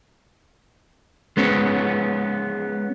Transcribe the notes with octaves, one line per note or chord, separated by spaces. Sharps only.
G#3 B3 C#4